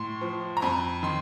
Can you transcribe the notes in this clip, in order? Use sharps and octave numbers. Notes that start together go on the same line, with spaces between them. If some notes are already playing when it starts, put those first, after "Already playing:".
Already playing: A2 C6
F3
A#5
F2 B5
D#3 C6